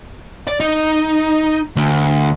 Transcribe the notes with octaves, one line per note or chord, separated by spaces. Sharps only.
D5
D#4
D2